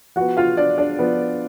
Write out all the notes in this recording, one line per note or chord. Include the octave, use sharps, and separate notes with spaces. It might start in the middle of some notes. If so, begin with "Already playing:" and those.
F3 B3 F#4 F#5
F4 F5
D4 D5
D4 D5
F3 B3